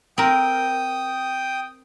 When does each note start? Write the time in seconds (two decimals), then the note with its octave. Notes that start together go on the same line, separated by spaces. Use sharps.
0.18 C4 A#4 G5 D#6